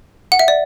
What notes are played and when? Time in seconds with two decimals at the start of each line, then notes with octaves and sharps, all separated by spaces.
0.32 F#5
0.39 E5
0.48 D5